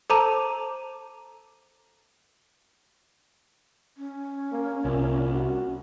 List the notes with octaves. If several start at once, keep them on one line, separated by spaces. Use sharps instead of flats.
A4 C5 A5 A#5 D6 D#7
C#4
A#3
C2 A#2
F#4